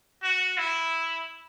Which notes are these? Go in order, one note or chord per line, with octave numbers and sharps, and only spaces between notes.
F#4
E4